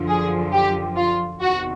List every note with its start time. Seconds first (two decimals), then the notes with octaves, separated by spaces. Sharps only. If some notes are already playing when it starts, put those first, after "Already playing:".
Already playing: F#2 D3 F3
0.09 G#4
0.53 G4
0.97 F4
1.41 E2 C3 D#3 F#4